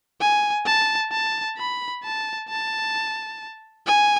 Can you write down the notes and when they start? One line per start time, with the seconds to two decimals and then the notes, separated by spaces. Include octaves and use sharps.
0.21 G#5
0.66 A5
1.12 A5
1.58 B5
2.03 A5
2.49 A5
3.86 G#5